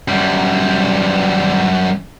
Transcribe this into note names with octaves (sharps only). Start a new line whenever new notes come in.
F#2 G3